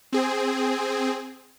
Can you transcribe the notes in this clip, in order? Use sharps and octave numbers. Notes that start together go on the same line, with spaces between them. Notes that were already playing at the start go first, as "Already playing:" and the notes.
C4 G#4